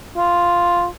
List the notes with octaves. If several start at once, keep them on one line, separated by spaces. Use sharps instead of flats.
F4